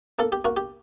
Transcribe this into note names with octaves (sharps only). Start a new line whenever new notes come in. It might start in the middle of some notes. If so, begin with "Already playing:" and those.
A#3 A4
G4
A#3 F#4
G4